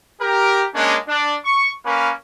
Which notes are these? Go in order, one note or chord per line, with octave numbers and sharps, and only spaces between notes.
G4 A#4
G#3 A#3 C#4 D4
D4
C#6
A#3 C#4 B4